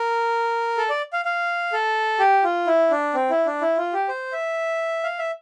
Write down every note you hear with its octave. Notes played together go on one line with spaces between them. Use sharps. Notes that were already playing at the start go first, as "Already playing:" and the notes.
Already playing: A#4
A4
D5
F5
F5
A4
G4
F4
E4
D4
C4
E4
D4
E4
F4
G4
C5
E5
F5
E5